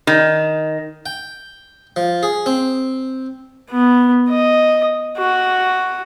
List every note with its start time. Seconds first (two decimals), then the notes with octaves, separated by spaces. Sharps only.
0.07 D#3
1.06 G5
1.96 F3
2.23 G#4
2.46 C4
3.71 B3
4.30 D#5
5.18 F#4